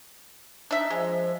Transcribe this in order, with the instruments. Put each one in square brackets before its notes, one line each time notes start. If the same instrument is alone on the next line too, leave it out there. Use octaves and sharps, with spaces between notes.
[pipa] D4 E5 [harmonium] D#4
[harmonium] F3 [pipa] G#3